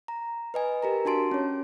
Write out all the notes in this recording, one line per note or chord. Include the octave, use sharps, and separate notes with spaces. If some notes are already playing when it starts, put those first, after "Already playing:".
A#5
B4 D#5 G#5
G4 A#4 A#5
D4 F#4 A5 C6 D7
C#4 C#5